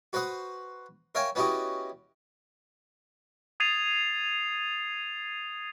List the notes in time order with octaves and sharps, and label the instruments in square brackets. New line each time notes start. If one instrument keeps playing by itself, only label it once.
[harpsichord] F#4 B4 C5 F#5 D#6
A#4 C#5 E5 F5 G5 G#5
B3 C#4 E4 F#4 G4 D#5
[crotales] D#6 G#6 A6 C7 D#7 F7